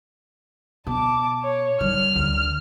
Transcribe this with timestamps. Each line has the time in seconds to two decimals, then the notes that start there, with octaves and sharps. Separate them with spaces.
0.87 B2 A5 D6
1.44 C#5
1.80 D#3 G3 F6
2.16 D2